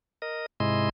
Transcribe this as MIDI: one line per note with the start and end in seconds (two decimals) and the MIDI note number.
0.22 0.46 70
0.22 0.46 75
0.60 0.89 44
0.60 0.89 48
0.60 0.89 56
0.60 0.89 64
0.60 0.89 75
0.60 0.89 84